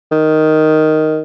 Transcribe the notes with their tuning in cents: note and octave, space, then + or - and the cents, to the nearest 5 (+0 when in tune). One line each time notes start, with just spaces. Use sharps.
D#3 +0